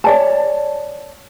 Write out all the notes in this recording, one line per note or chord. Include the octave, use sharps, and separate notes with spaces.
C#5 D5 A5